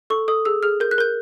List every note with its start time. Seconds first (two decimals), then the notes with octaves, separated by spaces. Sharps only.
0.10 A4 C#6
0.28 A4 D#6
0.45 G#4 E6
0.63 G#4 F6
0.80 A#4 G6
0.91 F#6
0.98 A#4 G6